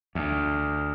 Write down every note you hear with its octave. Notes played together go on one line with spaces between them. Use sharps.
D2